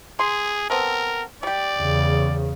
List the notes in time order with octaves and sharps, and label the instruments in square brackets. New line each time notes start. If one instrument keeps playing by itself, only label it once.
[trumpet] G#4 [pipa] C6
[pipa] B3 C4 A4 [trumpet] A#4
[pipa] G3 G4 [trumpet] D5
[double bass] E2 C#3